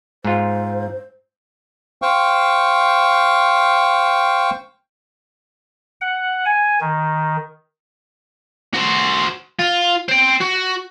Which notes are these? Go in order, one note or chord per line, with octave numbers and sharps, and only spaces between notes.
G#2 F4 C5
C5 F5 G5 C#6
F#5
G#5
D#3
F#4 C5
F4
C5 G5
F#4